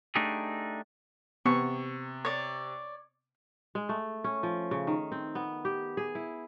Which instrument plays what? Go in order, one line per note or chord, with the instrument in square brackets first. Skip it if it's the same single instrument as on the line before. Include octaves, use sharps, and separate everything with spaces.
[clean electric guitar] A3 D4 D#4 G4 G#4
[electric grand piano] C3 [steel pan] B3 [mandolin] C#6
[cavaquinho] C#5 D5
[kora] G#3
A3
C#4
F3
C#3
D#3
C4
B3
G4
G#4
E4